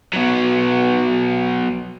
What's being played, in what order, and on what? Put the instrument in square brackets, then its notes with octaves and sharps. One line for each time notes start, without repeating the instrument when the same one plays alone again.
[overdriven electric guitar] F#3 B3